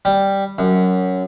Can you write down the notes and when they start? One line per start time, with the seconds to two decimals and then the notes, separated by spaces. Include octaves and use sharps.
0.05 G3
0.58 F#2